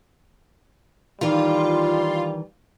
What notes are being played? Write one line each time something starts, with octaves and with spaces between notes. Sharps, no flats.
D#3 E3 G3 F4